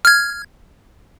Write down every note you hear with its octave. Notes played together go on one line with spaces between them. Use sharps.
F6 G#6